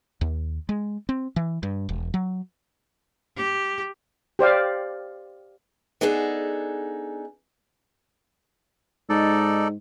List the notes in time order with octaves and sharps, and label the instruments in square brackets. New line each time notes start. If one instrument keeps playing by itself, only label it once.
[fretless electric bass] D#2
G#3
C4
E3
G2
E1
F#3
[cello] G4
[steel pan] G4 C5 D5 F5
[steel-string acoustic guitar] B3 D4 D#4 G#4 A4
[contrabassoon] G#2 [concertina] D#4 A4 D5